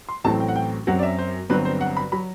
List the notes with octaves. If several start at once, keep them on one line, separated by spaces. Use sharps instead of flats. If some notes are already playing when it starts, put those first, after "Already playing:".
C6
A1 A2 F#3 A3 C4 A5
G5
F#5
G5
F#2 F#3 C4 F#5
D5
E5
C5
G1 G2 F#3 C4 B4
C5
F#5
B5
F#3 B5